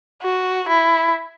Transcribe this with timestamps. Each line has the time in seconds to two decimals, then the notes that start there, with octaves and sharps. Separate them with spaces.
0.22 F#4
0.69 E4